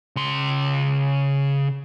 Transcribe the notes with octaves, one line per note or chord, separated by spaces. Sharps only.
C#3 C6